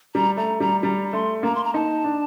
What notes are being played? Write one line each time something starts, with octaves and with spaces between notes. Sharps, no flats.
G3 A#5
A3 A#5
G3 A#5
G3 A#5
A3 C6
A#3 A#5
C6
A#5
D#4 A5
D4